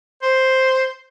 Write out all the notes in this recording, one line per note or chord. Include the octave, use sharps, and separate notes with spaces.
C5